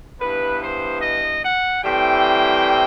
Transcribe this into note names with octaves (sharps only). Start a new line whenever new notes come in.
G2 E3 B3 B4
C5
D#5
F#5
A2 E3 G3 C4 G5